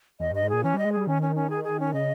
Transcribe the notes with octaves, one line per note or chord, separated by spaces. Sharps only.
E2 D#5
G2 D#5
G#2
A#2 G#4
E3 C#4
G3 D#5
G#3
G3 G#4
D#3 C#4
C#4
C#4
G#4
G#4
C#4
C#3 D#5